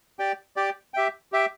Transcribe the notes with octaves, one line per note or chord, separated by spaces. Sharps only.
G4 D5 G5
G4 D5 G5
G4 E5 G5
G4 E5 G5